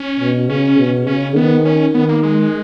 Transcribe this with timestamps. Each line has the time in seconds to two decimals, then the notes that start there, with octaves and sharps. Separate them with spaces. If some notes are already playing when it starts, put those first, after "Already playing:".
Already playing: C#4
0.20 B2
0.49 C#3 C#4
0.79 B2
1.07 C#3 C#4
1.36 D#3 B3
1.65 C#4
1.94 D#3 B3
2.09 A#3
2.23 G#3